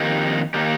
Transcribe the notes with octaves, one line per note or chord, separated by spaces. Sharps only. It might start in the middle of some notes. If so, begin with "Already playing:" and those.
Already playing: F2 D#3 A#3 D#4 G4
D#3 A#3 D#4 G4